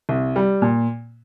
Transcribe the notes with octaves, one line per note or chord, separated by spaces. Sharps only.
C2
G3
A#2